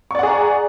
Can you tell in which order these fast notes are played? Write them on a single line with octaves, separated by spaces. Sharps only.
C#6 D5 F#5 G#4 A#5